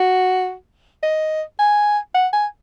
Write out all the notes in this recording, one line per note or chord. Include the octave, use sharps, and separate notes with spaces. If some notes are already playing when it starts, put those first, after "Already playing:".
Already playing: F#4
D#5
G#5
F#5
G#5